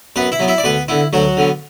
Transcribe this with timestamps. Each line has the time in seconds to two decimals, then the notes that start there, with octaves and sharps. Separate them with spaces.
0.16 F#2 B3 B4
0.32 E4 E5
0.40 F#3 B3
0.48 E4 E5
0.58 D5
0.64 D2 B3 B4
0.88 D3 B3 E4
1.13 D2 F#3 F#4
1.37 D3 B3